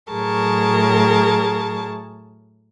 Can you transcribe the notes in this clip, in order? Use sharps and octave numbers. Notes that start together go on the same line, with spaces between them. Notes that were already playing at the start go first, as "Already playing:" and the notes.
A2 F#3 G#4 A#4 A5 C#6